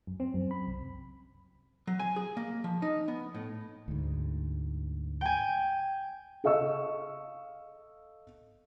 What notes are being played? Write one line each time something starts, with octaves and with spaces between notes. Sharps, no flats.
F#2
C4
F#2
B5
C2
F#3
G#5
G#4
A#3
F3
D#4
B3
A2
D2 G#2
G5 G#5
A4 D#5 F5 C#6 E6